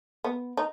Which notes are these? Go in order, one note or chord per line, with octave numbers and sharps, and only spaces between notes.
B3
D#4